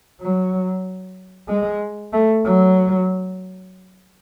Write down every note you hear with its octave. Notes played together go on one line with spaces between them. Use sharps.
F#3
G#3
A3
F#3